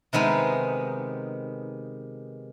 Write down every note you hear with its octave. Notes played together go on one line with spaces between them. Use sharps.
C3 D#3 G#3 B3 D#4